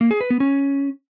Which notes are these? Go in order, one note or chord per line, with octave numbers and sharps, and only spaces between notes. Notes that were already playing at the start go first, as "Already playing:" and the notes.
A#3
G#4
B4
B3
C#4